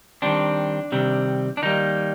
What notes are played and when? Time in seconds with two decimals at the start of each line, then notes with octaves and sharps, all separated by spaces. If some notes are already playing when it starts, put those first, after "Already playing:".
0.22 D#3 G3 C4 D4
0.92 C3 D#3 G3 C4
1.57 D4
1.62 D#3 G3 A#3 D#4